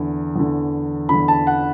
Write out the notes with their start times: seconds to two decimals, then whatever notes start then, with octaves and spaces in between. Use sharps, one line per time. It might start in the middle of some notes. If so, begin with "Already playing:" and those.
Already playing: E2 D3
0.36 E2 D3
1.09 E2 D3 B5
1.28 A5
1.47 F#5